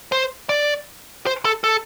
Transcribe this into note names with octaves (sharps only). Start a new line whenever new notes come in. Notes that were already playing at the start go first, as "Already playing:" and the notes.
C5
D5
C5
A4
A4